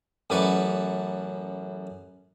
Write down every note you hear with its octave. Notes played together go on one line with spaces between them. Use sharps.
A1 F#2 B4 D5 C#6